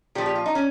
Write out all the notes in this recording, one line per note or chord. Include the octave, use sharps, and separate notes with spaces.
A#2 F3 G4
G4
F4
D#4
C#4